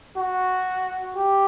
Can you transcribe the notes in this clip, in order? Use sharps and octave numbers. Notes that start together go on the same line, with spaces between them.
F#4
G4